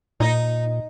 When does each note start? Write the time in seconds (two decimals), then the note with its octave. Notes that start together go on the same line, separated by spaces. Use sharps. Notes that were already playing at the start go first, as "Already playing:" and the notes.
0.20 A#2 D#4